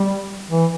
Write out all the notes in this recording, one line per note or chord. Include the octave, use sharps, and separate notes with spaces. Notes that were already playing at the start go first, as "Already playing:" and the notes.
Already playing: G3
E3